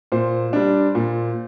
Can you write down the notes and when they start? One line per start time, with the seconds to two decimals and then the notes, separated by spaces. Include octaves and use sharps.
0.12 A#2 C5
0.53 G3 D4
0.95 A#2